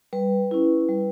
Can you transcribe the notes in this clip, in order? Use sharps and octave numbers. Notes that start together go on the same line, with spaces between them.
G3 B4
C#4 E4
G3